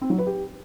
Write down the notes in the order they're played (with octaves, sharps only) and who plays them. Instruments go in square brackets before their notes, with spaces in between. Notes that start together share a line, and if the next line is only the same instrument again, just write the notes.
[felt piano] C4
F#3
B4
G4